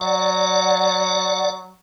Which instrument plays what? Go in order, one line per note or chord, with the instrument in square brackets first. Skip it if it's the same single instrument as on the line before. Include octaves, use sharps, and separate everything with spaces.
[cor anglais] F#3 [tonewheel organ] D5 F#5